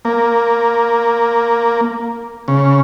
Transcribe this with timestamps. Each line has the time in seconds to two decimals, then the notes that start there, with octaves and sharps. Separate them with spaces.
0.05 A#3
2.48 C#3